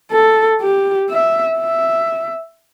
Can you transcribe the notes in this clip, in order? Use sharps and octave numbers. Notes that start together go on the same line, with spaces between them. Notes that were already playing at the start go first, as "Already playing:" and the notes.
A4
G4
E5
E5